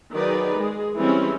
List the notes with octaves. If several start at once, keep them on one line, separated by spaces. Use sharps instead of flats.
D#3 F#3 D#4 G#4 B4 D5
G#3 G#4
E3 G3 G#3 C4 C#4 C#5